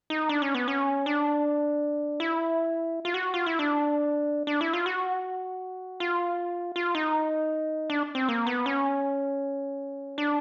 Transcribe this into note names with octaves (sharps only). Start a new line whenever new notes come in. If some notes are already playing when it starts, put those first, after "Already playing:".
D#4
D4
C#4
B3
C#4
D4
E4
F4
F#4
F4
E4
D4
D4
E4
F4
F#4
F4
F4
D#4
D4
C4
A#3
B3
C#4
D4